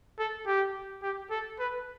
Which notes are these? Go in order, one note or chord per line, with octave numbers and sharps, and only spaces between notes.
A4
G4
G4
A4
B4